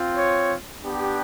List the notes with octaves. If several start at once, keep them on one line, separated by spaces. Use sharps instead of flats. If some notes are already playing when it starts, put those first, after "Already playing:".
Already playing: C4 F4
C#5
B3 D4 G4